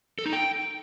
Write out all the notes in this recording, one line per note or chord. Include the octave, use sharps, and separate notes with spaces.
A4
D#4
G5